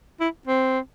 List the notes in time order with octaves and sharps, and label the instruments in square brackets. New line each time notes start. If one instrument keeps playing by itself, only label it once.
[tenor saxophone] E4
C4